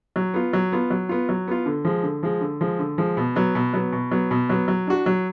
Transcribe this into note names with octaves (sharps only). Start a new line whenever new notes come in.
F#3
B3 F4
F#3
B3 F4
F#3
B3 F4
F#3
B3 F4
D3
F3 G#3
D3
F3 G#3
D3
F3 G#3
D3
F3 G#3
B2
F#3 B3
B2
F#3 B3
B2
F#3 B3
B2
F#3 B3
F#3
D4 F#4
F#3